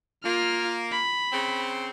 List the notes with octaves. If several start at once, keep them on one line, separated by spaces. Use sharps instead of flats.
A#3 F4 F6
B5
C#3 C4